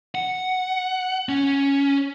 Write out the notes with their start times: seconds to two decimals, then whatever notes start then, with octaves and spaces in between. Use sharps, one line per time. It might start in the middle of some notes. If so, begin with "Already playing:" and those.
0.15 F#5
1.29 C#4